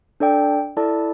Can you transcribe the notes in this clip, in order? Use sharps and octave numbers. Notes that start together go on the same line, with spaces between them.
D4 A4 D5 G5
E4 A4 D5 A5